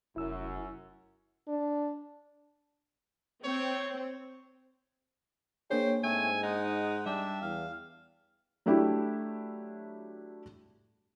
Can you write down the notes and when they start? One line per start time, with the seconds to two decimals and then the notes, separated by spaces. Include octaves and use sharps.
0.16 F1 F#2 E4 E6
1.48 D4
3.44 C4 C#5
5.70 A#3 D4 G#4 C5 C#5 G5
6.03 G#2 A3 C4 G#5
6.43 G#3 D#4 F#5
7.06 G3 D4 D5 E5 G5
7.42 E2 F5
8.66 F#3 A3 D4 E4 G4